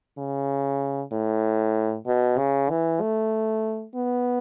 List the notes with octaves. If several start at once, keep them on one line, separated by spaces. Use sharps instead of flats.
C#3
A2
B2
C#3
E3
A3
B3